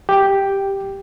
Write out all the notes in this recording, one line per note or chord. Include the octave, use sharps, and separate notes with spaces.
G4